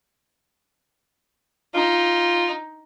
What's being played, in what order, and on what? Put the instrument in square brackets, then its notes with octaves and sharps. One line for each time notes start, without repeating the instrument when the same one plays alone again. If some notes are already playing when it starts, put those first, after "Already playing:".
[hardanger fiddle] D#4 [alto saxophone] F4